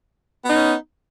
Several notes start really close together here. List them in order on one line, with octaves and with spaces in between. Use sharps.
B3 D#4 C#4